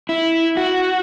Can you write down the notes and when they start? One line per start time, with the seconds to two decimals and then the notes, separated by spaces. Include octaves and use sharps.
0.09 E4
0.57 F#4